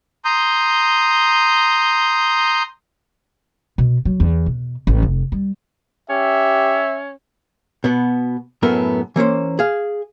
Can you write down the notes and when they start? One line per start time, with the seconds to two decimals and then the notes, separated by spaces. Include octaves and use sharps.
0.25 A#5 C6 D#6 G6
3.78 B2
4.05 F#3
4.20 E2
4.46 B2
4.87 A1
5.03 F1
5.32 G3
6.10 C#4 G4 E5
7.84 B2 B3
8.63 F#2 A2 A3 B3 A#4
9.16 E3 A#3 C#4 C5
9.59 G#4 F5